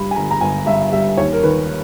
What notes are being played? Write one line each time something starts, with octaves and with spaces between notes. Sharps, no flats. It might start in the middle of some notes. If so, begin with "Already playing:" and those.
Already playing: G2 G3 B5
G#5
G1 A#5
A#5
G1 G#5
G2 E5
G3 E5
D#2 C#5
A#4
D#3 B4